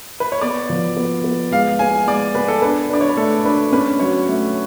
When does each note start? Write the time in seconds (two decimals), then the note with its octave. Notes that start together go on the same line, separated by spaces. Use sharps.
0.20 B4
0.32 C#5
0.41 B3 D5
0.69 F3
0.97 B3
1.24 B3
1.52 G#3 F5
1.79 B3 G#5
2.08 G#3 D5
2.35 B3 B4
2.48 A4
2.62 D4 B4
2.90 D4 D5
3.01 C#5
3.09 B4
3.17 A3 A4
3.45 D4 B4
3.73 C#4 B4
4.00 F#3 C#5
4.28 A3